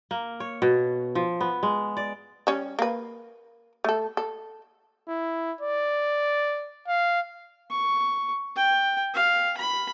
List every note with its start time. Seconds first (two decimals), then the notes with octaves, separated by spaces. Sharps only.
0.11 A#3
0.40 C#5
0.62 B2
1.15 F3
1.41 B3
1.63 G#3
1.97 D5
2.47 G3 C#4
2.79 A#3 B4
3.84 A3 A4
4.17 A4
5.08 E4
5.61 D5
6.88 F5
7.70 C#6
8.56 G5
9.14 F5
9.57 B5